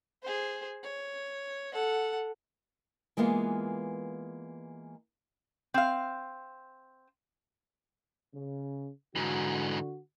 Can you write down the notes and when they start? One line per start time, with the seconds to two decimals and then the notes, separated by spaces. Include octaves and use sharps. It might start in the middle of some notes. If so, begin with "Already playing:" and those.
0.22 G#4 C5
0.83 C#5
1.73 A4 F#5
3.17 E3 G#3 A#3 B3 F4
5.74 C4 F5
8.35 C#3
9.16 G#2 D3 E3 F#4